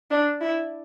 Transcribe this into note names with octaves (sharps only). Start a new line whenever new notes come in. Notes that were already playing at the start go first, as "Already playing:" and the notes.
D4
E4